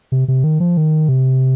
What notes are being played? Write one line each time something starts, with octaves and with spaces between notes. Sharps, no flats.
C3
C3
D#3
F3
D#3
C3